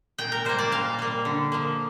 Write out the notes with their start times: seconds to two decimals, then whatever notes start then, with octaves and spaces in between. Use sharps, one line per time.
0.18 A#2 G5
0.32 A#4
0.45 G3 A#3 C5
0.59 D5
0.72 A#2 F5
0.99 G3 A#3
1.25 D3
1.52 F3 A#3